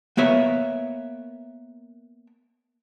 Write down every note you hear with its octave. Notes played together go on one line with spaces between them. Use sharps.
A#3 B3 C#5 E5